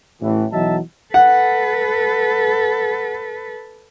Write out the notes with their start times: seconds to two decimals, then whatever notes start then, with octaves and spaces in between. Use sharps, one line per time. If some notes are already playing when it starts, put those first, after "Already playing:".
0.21 A1 A2 E3
0.52 B1 E3 F#3 D#5 E5 A5
1.14 A4 B4 F#5